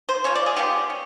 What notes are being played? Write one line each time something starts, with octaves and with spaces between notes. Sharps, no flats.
C5
F3 A#3 C#4 C#5
D5
G#4
C#3 F3 G#3 B3 G4
C#4